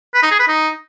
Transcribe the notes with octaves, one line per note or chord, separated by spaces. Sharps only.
B4
D#4
G#4
B4
D#4